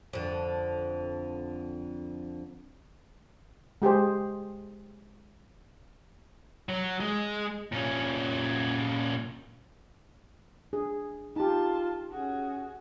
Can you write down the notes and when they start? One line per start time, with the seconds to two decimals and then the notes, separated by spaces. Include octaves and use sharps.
0.13 F2 D3
3.82 G#3 G4 G#4 C5
6.69 F#3
7.00 G#3
7.72 A#2 C#4
10.73 D4 G#4
11.36 D#4 F4 G4 A5 C6
12.10 C#4 F#4 G#4